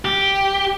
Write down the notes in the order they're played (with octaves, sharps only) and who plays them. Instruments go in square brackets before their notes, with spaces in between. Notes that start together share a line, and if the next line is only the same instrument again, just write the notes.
[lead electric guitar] G4